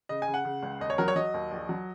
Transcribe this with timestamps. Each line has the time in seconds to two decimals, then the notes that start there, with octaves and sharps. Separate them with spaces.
0.09 C#3 D#5
0.22 G#5
0.28 C#3
0.34 F#5
0.45 C#3
0.63 C#2
0.80 D#2 D#5
0.90 C#5
0.98 F#3 A#4
1.08 C#5
1.16 F#3 D#5
1.34 D#2
1.51 A#1
1.69 F#3